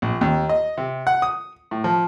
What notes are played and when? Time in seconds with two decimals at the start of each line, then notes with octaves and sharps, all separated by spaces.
0.02 A#1
0.21 D#2
0.49 D#5
0.78 C3
1.07 F#5
1.22 D#6
1.71 A2
1.84 F3